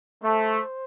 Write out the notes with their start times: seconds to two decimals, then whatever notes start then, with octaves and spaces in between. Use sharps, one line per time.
0.24 A3 C5